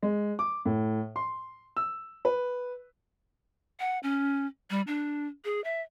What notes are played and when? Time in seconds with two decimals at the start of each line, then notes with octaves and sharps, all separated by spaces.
0.03 G#3
0.39 D6
0.66 A2
1.16 C6
1.77 E6
2.25 B4
3.80 F#5
4.03 C#4
4.70 G3
4.87 D4
5.45 G#4
5.64 E5